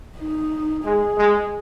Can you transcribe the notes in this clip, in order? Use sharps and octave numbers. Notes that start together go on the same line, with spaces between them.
D#4
G#3 G#4
G#3